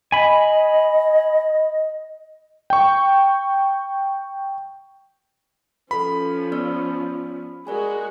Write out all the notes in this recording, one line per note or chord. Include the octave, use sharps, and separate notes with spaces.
D#5 G#5 B5
G5 C#6
F3 C#4 A4 B4 B5
B3 D5 E6
G#3 F#4 G#4 A#4 D5 G#5